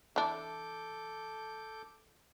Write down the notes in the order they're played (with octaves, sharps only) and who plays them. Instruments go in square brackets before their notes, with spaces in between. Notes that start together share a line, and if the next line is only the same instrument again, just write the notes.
[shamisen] E3 D4 [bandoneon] A4 D6 G6